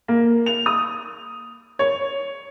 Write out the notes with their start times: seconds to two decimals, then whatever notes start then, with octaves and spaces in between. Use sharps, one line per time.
0.08 A#3
0.46 F7
0.66 D#6
1.79 C#5